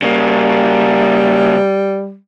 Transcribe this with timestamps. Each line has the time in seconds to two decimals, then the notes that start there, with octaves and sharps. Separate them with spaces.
0.02 C#3 G3 A#3